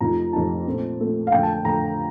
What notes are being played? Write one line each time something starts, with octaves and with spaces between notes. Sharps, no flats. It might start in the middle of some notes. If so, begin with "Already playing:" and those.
F2 C3 F3 A3 D#4 A#5
F2 C3 F3 A3 D#4 A5
A#2 A3 C4
A#2 A3 C4
F5
F2 D3 A3 G5
A5
A5
F2 D3 A3 A#5